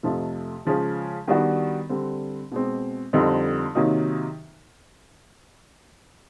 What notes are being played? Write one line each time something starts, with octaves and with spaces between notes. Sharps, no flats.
F2 C3 F3 A3
C#3 F3 G#3
D#3 G3 B3 D4 F#4
D3 G3 C4
B2 G#3 C4
F2 D3 G3 C4 D#4
C3 D#3 F#3 A#3 D#4